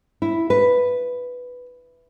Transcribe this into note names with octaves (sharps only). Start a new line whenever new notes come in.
E4
B4